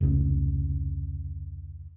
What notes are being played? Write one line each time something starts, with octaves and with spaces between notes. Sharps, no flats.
F1 C#2